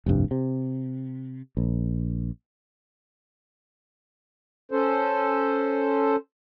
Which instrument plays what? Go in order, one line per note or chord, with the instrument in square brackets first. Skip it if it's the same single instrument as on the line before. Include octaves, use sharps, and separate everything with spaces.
[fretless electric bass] F1 C2 G2
C3
A#1
[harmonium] C#4 A4 C5